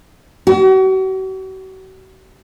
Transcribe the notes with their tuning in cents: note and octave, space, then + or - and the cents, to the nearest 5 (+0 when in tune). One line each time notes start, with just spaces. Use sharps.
F#4 +40